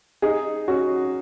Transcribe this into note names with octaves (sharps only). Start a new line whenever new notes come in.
D#4 G#4
C#4 F#4